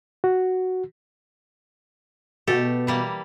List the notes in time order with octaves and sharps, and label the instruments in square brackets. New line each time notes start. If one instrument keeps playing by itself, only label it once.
[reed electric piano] F#4
[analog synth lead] B2 [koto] A3 G4 A4
[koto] E3 G3 A#3